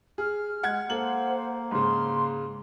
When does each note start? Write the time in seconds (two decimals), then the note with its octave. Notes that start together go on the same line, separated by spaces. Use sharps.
0.18 G#4 F6
0.63 G#3 F#5 G#6
0.90 A#3 A4 C5 F#5 F#7
1.71 G#2 C#3 C6